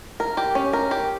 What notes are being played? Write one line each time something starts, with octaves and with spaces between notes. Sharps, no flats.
A#4
G4
C#4
A#4
G4